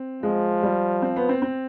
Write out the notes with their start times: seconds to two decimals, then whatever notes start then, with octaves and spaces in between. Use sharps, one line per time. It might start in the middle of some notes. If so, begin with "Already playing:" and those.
Already playing: C4
0.23 F3 G#3
0.63 G3
1.02 C4
1.16 B3
1.29 C4
1.42 C4